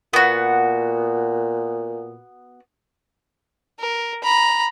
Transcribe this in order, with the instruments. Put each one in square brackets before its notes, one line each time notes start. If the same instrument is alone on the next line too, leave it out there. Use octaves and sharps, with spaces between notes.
[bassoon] A#2 [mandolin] B3 F#4
[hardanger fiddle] A#4
A#5 B5